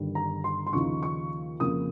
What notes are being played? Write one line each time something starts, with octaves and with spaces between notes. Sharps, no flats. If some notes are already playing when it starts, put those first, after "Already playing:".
Already playing: G1 G2 D#3 G3
A#5
C6
C6
D#2 C#3 F3 A#3 D#4 C#6
C#6
F2 C#3 F3 A#3 D#6